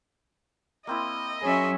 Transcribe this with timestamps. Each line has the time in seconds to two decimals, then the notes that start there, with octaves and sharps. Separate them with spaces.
0.87 A#3 C4 E4 D#5
1.42 F#3 C#4 G#4 E5